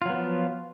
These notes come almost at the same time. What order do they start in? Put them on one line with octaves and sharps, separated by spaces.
F4 F#3 B3 F3